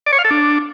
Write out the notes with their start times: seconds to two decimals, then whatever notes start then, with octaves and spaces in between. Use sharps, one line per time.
0.06 D5
0.12 C#5
0.19 F5
0.25 A4
0.31 D4